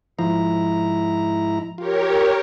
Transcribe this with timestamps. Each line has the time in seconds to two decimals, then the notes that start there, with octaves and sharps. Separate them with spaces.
0.19 G#2 F3 E4 A#5
1.78 F4 G4 A#4 C#5